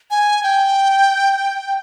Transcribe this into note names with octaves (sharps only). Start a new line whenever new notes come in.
G#5
G5